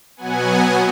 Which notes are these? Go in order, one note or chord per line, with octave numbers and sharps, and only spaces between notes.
B2 F#3 B3 F#5 G#5